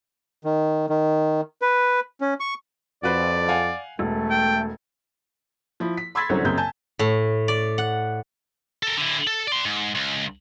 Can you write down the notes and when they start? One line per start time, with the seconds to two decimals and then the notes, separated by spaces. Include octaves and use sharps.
0.44 D#3
0.90 D#3
1.62 B4
2.21 C#4
2.40 C#6
3.03 F2 F#4 B4 C5 D5
3.49 F5 F#5 G#5
3.99 E1 A3
4.30 G5
5.80 F3 E4
5.97 B6
6.15 B5 C6 E6 G#6 A6 B6
6.29 C2 D3 F#3 C#4 C5
6.44 A#1 F#2 C#3 C4 G6
6.58 G#5 A5 G6
6.99 A2
7.48 D5
7.78 F#5
8.83 A4 A#4
8.97 D3 E4
9.27 A4
9.47 D5 C6
9.66 G#2
9.95 C#2